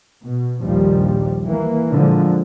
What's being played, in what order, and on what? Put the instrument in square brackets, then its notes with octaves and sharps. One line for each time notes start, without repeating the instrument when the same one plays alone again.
[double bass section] B2
A#1 D#2 F3 G3
E3 A#3
A#2 D3 F3 G#3